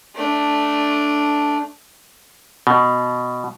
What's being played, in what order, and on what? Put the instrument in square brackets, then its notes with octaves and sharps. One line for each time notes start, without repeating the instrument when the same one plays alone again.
[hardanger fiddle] A3 D4
[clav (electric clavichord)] B2